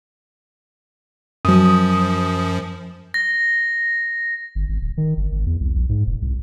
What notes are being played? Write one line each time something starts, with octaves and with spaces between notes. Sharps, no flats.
F#2 F3 F#3 D#6
A#6
G1
G#1
D1
D#3
G1
G#1
E2
C2
A#1
G#2
E1
C2